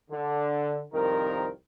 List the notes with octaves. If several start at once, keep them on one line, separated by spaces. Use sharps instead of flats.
D3
C2 F2 D#3 C4 A#4